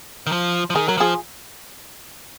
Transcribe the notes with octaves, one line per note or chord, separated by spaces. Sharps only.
D#3
F3
F3
D#3 G#4
F#3 A#4
F3 F4 G#4